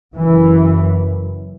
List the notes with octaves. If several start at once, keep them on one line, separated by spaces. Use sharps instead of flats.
F#1 F#2 E3